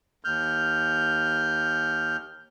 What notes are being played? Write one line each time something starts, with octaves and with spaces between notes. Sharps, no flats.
D#2 F6 G6